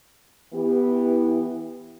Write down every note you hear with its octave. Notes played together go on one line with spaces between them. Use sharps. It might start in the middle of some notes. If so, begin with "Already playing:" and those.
E3 B3 G4